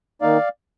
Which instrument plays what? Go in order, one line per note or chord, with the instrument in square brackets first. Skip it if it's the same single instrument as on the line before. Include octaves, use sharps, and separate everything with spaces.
[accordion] D#3 A#3 D#4 D5 F5